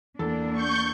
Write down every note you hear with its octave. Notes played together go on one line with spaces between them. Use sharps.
E2 A#3 D4 A4
C#6 G6